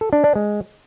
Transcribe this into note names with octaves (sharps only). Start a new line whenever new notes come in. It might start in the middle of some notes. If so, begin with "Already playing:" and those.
A4
D4
D4
G#3